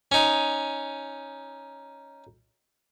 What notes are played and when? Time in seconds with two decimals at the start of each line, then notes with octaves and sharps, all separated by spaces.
0.12 C#4 D#4